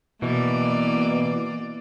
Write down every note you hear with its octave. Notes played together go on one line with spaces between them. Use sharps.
B2 E3 A#3 D5